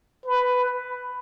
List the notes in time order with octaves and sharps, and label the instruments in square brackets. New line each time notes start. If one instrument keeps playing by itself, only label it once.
[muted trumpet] B4